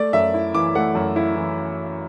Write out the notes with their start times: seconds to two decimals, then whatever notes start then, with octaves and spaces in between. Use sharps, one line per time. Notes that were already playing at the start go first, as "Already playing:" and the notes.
Already playing: A3 D5
0.13 F#2 E5
0.34 E4
0.54 E3 D6
0.75 A3 F#5
0.95 F#2
1.16 E4
1.36 E3